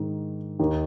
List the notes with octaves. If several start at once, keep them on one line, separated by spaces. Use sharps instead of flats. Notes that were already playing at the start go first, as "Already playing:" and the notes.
Already playing: G#2 D#3
D#2 D#3